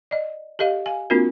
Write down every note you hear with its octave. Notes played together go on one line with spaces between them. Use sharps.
D5 D#5
G4 A4 D#5 F5
F5 G#5
A#3 C4 D4 F4 F#4 A#4